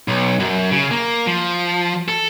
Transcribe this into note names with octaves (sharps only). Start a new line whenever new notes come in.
B1
F#2
C#3
A#3
F3
A4